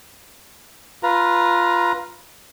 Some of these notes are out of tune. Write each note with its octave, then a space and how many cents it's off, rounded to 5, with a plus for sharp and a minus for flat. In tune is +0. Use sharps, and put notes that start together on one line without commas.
F4 +0 B4 -10 A#5 +10